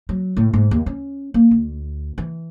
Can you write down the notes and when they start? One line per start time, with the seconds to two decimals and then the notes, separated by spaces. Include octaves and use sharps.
0.09 F#3
0.37 A2
0.53 G#2
0.71 D#2
0.86 C#4
1.34 A#3
1.51 D2
2.18 E3